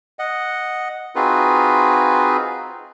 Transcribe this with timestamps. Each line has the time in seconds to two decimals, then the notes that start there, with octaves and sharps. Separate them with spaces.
0.19 D#5 F#5
1.15 C4 D#4 F4 F#4 G#4 B4